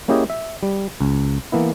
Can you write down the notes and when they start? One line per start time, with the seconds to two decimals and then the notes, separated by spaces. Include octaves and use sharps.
0.08 A#3 C#4 E4 G4 G#4 D#5
0.30 E5
0.63 G3
1.01 C#2
1.52 E3 A#3 B3 E4